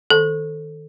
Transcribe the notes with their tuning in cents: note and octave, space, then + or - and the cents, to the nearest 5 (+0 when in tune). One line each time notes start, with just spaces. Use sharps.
D#3 +0 A4 +0